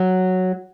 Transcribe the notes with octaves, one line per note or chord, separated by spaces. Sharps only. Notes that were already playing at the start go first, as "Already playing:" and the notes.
Already playing: F#3